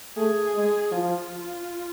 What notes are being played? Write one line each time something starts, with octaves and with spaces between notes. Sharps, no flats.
A3 G#4
G#3
F3 F4